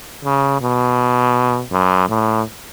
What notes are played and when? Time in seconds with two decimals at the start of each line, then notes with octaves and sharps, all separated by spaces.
0.25 C#3
0.61 B2
1.72 F#2
2.09 A2